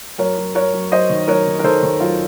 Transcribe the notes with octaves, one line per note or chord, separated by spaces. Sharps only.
F#2 A#4 C#5
F#2
F#2 A#4 C#5
F#2
F#2 C5 D#5
D#3
F#2 A#4 C#5
D#3
A#4
D#3 A4 C5
D#3
F#2 F4